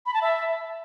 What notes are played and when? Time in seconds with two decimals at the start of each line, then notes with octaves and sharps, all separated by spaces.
0.06 B5
0.14 A5
0.22 E5